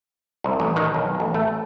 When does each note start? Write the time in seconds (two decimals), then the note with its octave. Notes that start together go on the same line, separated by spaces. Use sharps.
0.44 C2
0.60 A1
0.76 D#3
0.94 B1
1.20 A1
1.34 A3